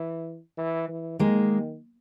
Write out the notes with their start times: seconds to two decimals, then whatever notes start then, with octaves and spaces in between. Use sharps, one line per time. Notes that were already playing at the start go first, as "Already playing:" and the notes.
Already playing: E3
0.58 E3
0.89 E3
1.19 D#3 G#3 A#3